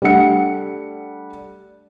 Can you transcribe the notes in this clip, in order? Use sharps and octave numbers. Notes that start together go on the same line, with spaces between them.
G3 A3 D4 F#5 C#7